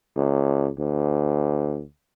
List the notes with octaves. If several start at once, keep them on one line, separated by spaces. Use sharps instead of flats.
C#2
D2